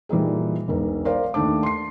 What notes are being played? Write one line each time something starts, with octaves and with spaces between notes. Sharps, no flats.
A#2 E3 G3 D#4 G#4
E1 B1 A#4
A#4 C5 D5 F5
D#2 A3 D4 A5 D6
C6 C7